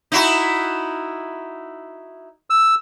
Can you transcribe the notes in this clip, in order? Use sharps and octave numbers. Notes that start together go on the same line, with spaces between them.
D#4 E4 F#4
E6